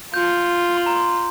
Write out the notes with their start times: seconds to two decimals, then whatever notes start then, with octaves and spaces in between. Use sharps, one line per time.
0.14 F4 G6
0.77 C6
0.86 A#5
0.96 C6